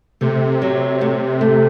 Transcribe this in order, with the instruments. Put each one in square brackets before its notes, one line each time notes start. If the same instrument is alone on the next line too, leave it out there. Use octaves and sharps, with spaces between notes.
[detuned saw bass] C3 [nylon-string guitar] A3
[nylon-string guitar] F#3
A3
A3